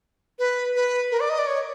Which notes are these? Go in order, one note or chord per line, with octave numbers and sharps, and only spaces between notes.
B4
B4
A#4
D5
D#5
D5
C#5